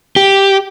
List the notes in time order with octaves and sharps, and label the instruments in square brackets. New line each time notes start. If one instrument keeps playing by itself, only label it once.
[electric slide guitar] G4